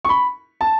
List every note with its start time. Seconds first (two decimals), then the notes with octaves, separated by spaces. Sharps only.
0.05 C#6
0.09 B5
0.61 A5